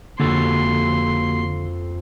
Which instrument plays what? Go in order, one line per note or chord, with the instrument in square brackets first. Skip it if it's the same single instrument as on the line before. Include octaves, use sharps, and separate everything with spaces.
[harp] F2 A4 [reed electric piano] D3 [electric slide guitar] A#3 F#4 G4 [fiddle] C6